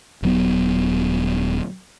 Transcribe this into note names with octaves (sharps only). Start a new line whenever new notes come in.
D#1 F#3 B3